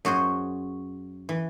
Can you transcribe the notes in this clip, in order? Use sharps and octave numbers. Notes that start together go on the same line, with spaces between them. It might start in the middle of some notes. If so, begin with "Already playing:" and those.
F#2 F#4 G#4 C5
E3